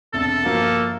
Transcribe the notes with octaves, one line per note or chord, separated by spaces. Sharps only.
E1 C2 A4
G1 F3 A#3 F#4